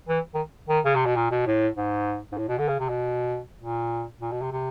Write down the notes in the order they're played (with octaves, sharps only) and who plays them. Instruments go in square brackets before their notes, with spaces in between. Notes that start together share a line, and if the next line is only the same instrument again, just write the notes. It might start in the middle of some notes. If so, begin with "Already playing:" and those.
[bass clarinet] E3
D#3
D#3
C#3
C3
B2
A#2
B2
A2
G#2
G#2
A2
B2
D3
C#3
C3
B2
A#2
A#2
B2
C3
C3